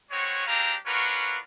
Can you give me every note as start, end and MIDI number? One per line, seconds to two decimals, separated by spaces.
0.11 0.46 56
0.11 0.46 59
0.11 0.46 60
0.11 0.46 66
0.11 0.46 73
0.47 0.75 56
0.47 0.75 60
0.47 0.75 62
0.47 0.75 67
0.47 0.75 77
0.47 0.75 82
0.86 1.38 61
0.86 1.38 62
0.86 1.38 65
0.86 1.38 66
0.86 1.38 70
0.86 1.38 71